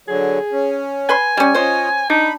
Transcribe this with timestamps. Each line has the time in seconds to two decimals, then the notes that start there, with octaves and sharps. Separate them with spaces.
0.08 D3 F#3 G#4
0.52 C#4
1.09 B4 G#5 C6
1.37 G3 C#4
1.54 C#4 F4 C5 C#5 D#5
2.10 D4 D#4 B5